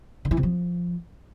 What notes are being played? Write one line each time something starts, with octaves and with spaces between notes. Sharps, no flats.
D3
E3
C3
F3